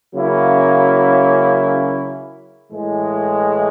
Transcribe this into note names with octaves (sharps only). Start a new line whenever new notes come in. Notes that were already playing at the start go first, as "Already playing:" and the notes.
C#3 F#3 A#3 C#4 E4
A2 E3 G#3